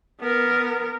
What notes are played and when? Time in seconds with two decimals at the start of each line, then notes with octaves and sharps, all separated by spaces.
0.21 B3 A#4